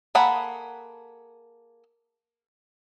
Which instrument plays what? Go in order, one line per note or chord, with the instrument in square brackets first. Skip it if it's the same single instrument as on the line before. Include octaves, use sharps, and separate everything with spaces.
[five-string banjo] A#3 G#4 A4 F#5 B5